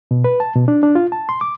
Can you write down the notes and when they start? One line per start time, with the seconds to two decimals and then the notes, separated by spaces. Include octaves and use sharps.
0.11 B2
0.24 B4
0.40 A5
0.55 B2
0.68 D4
0.83 D4
0.95 F4
1.12 A5
1.29 C6
1.41 D6